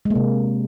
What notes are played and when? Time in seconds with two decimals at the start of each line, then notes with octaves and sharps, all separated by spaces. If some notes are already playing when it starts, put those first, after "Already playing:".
0.05 G#3
0.10 A#3
0.15 C3